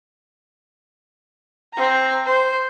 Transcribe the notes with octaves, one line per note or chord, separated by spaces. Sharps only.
C4 A#5
C5